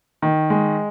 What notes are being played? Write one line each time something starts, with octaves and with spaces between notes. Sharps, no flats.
D#3
G#3